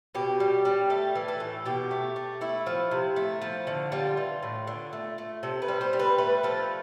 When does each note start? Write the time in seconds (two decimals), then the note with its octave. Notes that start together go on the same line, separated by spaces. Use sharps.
0.15 B2 G4
0.40 G3
0.65 G3
0.90 A3 A4
1.15 E3
1.28 A4
1.40 A2
1.65 B2 G4
1.91 A3
2.16 A3
2.41 A3 E4
2.66 F3
2.91 C3
3.16 A3
3.42 F3
3.67 D3
3.92 G3 F4
4.17 E3
4.43 A2
4.67 D3
4.93 A3
5.18 A3
5.43 C3 A4
5.62 B4
5.68 G3
5.81 C5
5.93 G3
5.99 B4
6.18 A3 B4
6.43 F3 A4